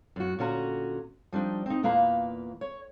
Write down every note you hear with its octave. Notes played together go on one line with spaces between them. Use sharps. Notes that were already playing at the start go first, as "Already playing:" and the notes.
F#2 F#4
A#2 D3 C#4 F#4 A5 A#5
F3 G3 D4 D#4
C4 D#4
E2 A#2 A#3 B4 F5 A#5
C#5